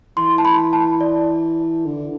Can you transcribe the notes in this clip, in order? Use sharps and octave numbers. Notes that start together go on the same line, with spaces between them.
E3 C6
A5
B5
A5
D5
D3